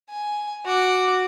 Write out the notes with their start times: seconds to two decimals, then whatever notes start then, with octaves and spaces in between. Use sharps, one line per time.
0.10 G#5
0.66 F#4 D6